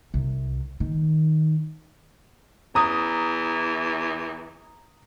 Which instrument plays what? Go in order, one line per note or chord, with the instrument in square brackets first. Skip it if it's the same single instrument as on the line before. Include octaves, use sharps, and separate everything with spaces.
[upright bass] C2
D#3
[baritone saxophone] E2 [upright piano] A#5 D#6